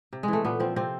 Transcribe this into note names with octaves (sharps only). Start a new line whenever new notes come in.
C3
E3 G#3
A3
A#2 B3
F3 C4
C3 C4